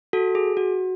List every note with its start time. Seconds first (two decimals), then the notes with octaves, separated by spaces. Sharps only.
0.13 F#4 A4
0.35 G#4
0.57 F#4